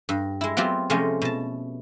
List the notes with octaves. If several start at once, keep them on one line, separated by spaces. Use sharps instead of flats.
G2
G#3 E4
F#3 B3 C4 F4 G4
C3 F3 G#3 A3 C#4
B2 A5